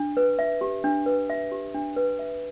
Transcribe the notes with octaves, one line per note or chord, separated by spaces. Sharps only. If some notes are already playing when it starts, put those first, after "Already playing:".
Already playing: D4
B4
E5
G4
D4
B4
E5
G4
D4
B4
E5